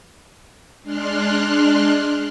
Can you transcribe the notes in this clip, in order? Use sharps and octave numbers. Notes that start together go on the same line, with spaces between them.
G#3 D4 C6 F6 F#6